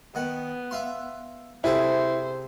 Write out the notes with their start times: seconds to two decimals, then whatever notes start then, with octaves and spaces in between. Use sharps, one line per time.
0.15 D#3 B3 F#5
0.71 E5 F5 C6
1.64 C3 E4 G#4 A4 C5